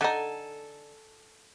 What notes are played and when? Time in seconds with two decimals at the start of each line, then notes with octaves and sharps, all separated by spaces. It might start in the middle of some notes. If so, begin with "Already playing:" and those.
0.01 D3 D#4 A4 G#5